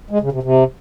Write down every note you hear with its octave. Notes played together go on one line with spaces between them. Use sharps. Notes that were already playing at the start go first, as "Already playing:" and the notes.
G#3
C#3
C3
C3